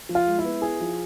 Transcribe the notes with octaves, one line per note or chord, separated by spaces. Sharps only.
F3
F4
G#3
E4
B3
E4 G#4
F3